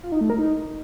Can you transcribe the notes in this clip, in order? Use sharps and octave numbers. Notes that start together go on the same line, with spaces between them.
F4
D#4
A3
A#4
D#4